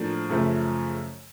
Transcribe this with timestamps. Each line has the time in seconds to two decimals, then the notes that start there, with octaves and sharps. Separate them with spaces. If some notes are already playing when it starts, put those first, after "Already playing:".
Already playing: A2 F3 A#3 D4
0.29 F#2 C#3 F3 A3